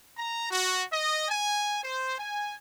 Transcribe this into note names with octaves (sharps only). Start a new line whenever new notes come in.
A#5
F#4
D#5
G#5
C5
G#5